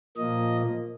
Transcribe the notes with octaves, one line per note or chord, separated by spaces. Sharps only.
A#2 F3 A#3 D#5